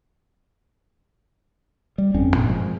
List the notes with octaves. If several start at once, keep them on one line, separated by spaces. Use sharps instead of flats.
G3
G1 F2 C4 C#4
G2 A#2
F3 G#3